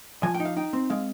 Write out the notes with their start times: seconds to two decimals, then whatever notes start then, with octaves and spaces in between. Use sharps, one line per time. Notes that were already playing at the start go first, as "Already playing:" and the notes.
0.23 F3 G#5
0.35 G5
0.40 D#4
0.45 F5
0.57 D#4 G5
0.73 C4
0.90 G#3 F5